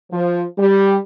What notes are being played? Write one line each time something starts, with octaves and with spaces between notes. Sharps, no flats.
F3
G3